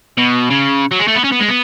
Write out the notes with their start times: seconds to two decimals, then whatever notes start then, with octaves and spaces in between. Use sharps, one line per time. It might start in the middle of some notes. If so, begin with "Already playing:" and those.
0.18 B2
0.50 C#3
0.92 F#3
1.00 G#3
1.08 A3
1.15 B3
1.24 C#4
1.32 B3
1.40 G#3
1.49 B3